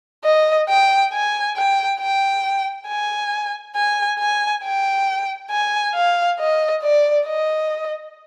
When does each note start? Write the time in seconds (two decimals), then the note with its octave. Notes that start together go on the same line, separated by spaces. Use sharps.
0.24 D#5
0.69 G5
1.13 G#5
1.57 G5
2.00 G5
2.88 G#5
3.75 G#5
4.19 G#5
4.64 G5
5.51 G#5
5.95 F5
6.40 D#5
6.83 D5
7.26 D#5